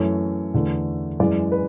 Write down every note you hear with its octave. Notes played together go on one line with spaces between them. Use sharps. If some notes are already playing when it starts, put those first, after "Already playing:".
Already playing: F#2 E3 A3 C#5
E2 D3 A3
F#2 E3 G#3 D5
B4